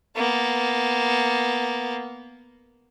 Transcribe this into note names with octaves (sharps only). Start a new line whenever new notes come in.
A#3 B3